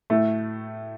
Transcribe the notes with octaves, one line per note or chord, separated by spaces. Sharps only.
A2 A3